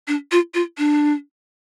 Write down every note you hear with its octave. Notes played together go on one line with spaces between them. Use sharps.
D4
F4
F4
D4